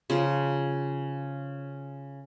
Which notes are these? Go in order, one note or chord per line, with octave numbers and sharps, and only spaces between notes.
C#3 F3 C#4